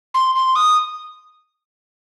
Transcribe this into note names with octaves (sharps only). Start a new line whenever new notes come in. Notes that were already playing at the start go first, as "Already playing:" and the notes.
C6
C6
D#6